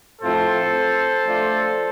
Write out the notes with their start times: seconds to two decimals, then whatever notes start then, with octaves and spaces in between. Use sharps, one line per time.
0.22 A2 F3 A3 C4 F4 A4 C5
1.25 F3 A3 D4 F4